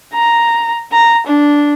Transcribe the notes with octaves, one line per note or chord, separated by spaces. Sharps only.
A#5
A#5
D4